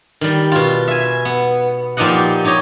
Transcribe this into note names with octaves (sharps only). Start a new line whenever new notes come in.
D#3 G3
B2 F4
E5 G#5
B3
A#2 F3 D#4 G4 D#5 F#5
D#4 G4 C#5 D#5